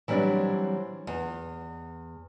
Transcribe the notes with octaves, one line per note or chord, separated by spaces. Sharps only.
E3 F#3 G3 C4 D4
E2